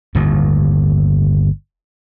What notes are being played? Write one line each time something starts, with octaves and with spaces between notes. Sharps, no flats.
G1 D#2 A2